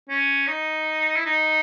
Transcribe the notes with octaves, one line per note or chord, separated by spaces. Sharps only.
C#4
D#4
E4
D#4